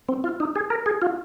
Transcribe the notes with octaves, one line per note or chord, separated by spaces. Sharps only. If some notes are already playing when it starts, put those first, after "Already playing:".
C4
F4
D#4
G#4
A#4
G#4
F4